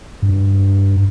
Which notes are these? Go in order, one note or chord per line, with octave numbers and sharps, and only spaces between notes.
G2